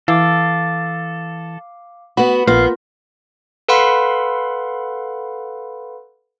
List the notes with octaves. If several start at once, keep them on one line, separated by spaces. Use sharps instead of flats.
E3 A4 F5 D6
B3 F#4 B5
A#1 B3 F4 A#4 F5
A4 B4 F5 F#5 B5 C6